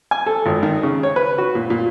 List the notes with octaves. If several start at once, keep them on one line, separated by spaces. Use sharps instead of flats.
G#5
A4
G#1
D#3
C#3
C#5
B4
F#4
A#2
A#2